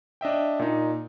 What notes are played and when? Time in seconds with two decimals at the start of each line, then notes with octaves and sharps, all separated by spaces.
0.21 D4 D#5 E5 G5
0.59 A#2 D#4